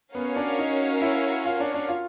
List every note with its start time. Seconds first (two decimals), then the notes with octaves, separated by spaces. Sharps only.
0.15 B3 C#4 F#4 A#4 C#5 F5
0.36 D4
0.59 D#4
1.01 E4
1.45 F4
1.60 D4
1.74 D4
1.89 F4